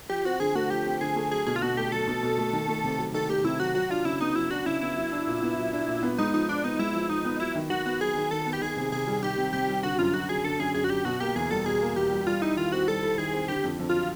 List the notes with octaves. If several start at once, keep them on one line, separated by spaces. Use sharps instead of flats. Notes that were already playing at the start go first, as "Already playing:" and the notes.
F3 G4
C4 F#4
D3 G#4
A3 F#4
F3 G4
C4
D3 G#4
A3
F#3 G#4
B2 G#4
F4
B2 F#4
A3 G4
F#3 A4
B2
B2
A3
D#3
A3
C3
F#3
D#3 A4
A3 G4
C3 E4
F#3 F#4
F#3 F#4
D4 F4
C#3 E4
B3 D#4
F#3 E4
D4 F#4
C#3 E4
B3 E4
F#3
D4
A#2
B3
F#3
D4
A#2
B3
G#3 D#4
F3 D#4
F3 D4
B3 D#4
G#3 E4
F3
F3 D#4
B3
F#3 E4
D#3
D#3 F#4
B3 F#4
F#3 G#4
D#3
D#3 A4
B3
G4
D#3 G#4
C3
C3 G#4
G3
D#3 G4
C3
C3 G4
G3
D3 F#4
F#2 F4
F#2 F#4
F#3 G#4
D3 A4
F#2 G#4
F#2 G#4
F#4
F#3 G4
B2 F#4
A#3 G4
E2 G#4
G3 A4
B2 G#4
A#3
E2 G4
G3
G3 F4
D#4 E4
D#3 F4
C4 F#4
G3 A4
E4
D#3 G#4
C4
D3 G4
F2
F2
F#3 F4